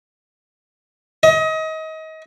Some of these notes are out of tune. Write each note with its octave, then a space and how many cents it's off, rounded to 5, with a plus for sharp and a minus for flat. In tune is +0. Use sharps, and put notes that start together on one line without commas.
D#5 +30